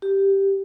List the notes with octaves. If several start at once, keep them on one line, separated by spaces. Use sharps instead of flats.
G4